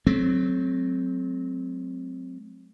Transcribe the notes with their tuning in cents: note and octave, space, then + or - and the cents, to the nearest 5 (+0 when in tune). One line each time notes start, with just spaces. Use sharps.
F#3 +0 A3 -40 C4 +0